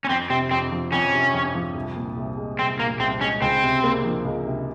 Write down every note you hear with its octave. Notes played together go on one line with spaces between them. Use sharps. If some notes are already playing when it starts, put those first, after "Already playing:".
C#4
F2 C4
C3 C4
F2 C4
F3
F2 C#4
C3
F2
F3
C2
A#2
C2
G#3
C2 C4
A#2 A#3
C2 C4
G#3 C#4
C#2 C4
C3
A#3
F3
C#2
C3